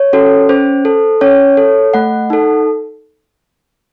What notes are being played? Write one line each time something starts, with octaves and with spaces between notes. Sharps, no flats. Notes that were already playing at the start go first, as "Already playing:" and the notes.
Already playing: C#5
C#4 F#4 A4
C#4 C5
A4
C#4 C#5
A4
A3 F#5
D#4 A4